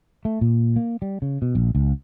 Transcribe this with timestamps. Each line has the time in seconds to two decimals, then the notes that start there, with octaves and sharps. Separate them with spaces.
0.25 A3
0.41 A#2
0.76 A#3
1.02 G3
1.22 C#3
1.42 B2
1.55 A#1
1.75 C#2